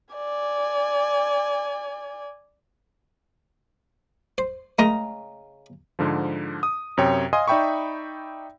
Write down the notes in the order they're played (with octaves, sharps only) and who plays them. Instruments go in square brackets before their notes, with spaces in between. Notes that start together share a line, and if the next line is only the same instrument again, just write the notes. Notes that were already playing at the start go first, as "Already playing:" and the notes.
[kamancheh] D5 G#5
[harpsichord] C5
[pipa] C#3 D#5 A#5 [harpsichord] G#3 A3 A#4
[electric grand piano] G#2 D3 F3
D#6
F#2 C3 C#5 G5
D#5 F5 G#5 C6 D#6
D#4 D5 E5 G5 B5 C#6